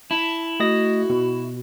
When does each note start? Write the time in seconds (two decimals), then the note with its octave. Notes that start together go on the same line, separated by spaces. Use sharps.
0.11 E4 A5
0.60 A3 F#4 D#5 A#6
1.10 B2